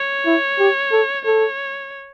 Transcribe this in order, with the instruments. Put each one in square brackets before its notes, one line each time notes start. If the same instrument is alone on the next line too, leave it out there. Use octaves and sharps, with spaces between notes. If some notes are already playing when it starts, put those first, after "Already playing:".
Already playing: [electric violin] C#5
[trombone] E4
G4
A4
[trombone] A4 [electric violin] C#5